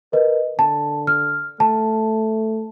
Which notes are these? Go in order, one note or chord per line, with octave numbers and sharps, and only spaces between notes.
A#4 B4 D#5
D3 A5
F6
A3 A5